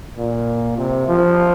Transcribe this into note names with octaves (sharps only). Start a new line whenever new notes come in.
A#2
C3
F3